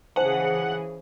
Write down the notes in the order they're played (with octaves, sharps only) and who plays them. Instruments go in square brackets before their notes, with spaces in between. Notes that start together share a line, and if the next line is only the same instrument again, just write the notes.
[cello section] C#3 E3 G#4 [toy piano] C5 G#5 A5 [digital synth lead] F#5